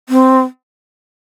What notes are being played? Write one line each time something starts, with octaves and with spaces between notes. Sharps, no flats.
C4